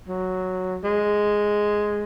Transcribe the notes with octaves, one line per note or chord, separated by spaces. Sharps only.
F#3
G#3